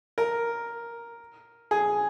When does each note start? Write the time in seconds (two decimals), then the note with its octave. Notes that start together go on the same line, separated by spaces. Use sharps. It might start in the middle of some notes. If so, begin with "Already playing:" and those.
0.18 A#4
1.71 G#4